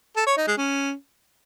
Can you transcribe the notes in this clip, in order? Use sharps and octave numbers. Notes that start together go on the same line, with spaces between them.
A4
C#5
D#4
G#3
C#4